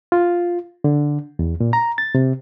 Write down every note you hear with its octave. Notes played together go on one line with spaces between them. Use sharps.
F4
D3
E2
A#2
A#5
A6
C3